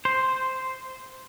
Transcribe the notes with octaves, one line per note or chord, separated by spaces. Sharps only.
C5